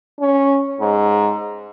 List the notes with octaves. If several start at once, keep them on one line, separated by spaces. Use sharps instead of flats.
C#4
G#2